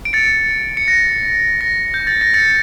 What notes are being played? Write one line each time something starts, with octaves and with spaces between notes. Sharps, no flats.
D7
A6 C#7
C#7
A#6
A#6
G6
A6
A#6
A6 C#7